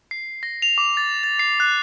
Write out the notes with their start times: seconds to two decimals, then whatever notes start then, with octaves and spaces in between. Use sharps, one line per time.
0.11 C7
0.43 A#6
0.62 F7
0.78 D6
0.97 A6
1.24 A6
1.39 C7
1.60 F#6